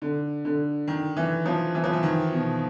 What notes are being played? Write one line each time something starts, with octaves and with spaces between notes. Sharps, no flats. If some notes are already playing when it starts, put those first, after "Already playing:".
D3
D3
D#3
E3
F3
E3
F3
E3
D#3
B2